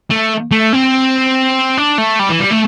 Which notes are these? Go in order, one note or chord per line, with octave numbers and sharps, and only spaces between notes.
A3
A3
C4
D4
A3
G3
E3
G3
A3